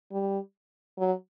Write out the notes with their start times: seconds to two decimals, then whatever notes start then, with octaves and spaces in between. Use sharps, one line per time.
0.12 G3
0.98 F#3